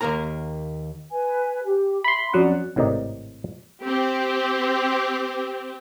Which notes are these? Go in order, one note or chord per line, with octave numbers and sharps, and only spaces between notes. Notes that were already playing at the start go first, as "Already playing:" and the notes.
D#2 A#2 A#3 A#4 A#5
B4 G#5
G4
E5 B5 C6
F2 F#3 C#4 D5 F#5
G#1 A2 C3 D#3 D#4 D5
C4 G4